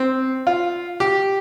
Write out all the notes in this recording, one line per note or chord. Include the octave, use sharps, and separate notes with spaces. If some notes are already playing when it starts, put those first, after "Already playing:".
Already playing: C4
F4
G4